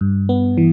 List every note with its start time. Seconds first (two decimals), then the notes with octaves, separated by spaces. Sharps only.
0.01 G2
0.29 B3
0.58 E3